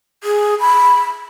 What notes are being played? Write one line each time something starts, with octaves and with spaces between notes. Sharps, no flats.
G#4
B5